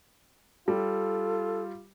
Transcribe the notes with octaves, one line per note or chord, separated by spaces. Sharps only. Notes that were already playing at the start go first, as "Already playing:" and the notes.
G3 F4 A4